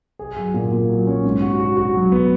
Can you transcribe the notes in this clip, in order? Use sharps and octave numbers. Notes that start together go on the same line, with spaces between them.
G#4
F#3
A#2
A#2
F#3
C#4
G#2
F#4
F#4
F#4
F#3
B3